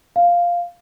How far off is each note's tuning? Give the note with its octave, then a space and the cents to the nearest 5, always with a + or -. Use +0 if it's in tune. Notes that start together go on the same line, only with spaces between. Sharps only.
F5 +0